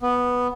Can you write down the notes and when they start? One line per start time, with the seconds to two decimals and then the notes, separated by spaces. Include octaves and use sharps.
0.01 B3